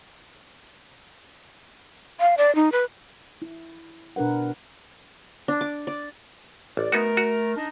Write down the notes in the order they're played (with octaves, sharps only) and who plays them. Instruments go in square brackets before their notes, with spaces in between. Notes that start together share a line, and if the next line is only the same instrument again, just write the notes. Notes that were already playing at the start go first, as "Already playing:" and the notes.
[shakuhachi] F5
D5
D#4
B4
[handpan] E4
B2 D4 A#4 B4 F#5
[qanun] D4
D6
D5
[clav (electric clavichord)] A1 [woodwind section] D5
[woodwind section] A3 A#4 [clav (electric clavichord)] B3 D#4 F#4
[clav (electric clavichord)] F#4
[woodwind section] D4 D#4